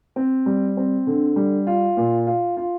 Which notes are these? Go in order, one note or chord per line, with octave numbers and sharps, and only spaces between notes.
C4
G3
C4
D3
G3
F4
A#2
F4
F4